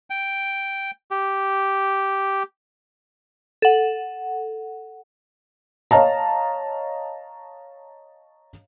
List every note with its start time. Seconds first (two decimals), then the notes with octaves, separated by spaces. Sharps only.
0.10 G5
1.11 G4
3.62 A4 F#5
5.91 C#5 D#5 F5 A5 A#5